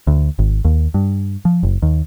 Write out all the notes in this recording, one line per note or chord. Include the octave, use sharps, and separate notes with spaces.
D2
G#1
D#2
G2
F3
F#1
D#2